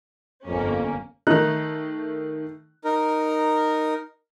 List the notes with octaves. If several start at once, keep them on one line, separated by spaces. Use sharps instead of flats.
G1 F2 A#3 C#4
D#3 A3 D#4 F#6
D#4 A#4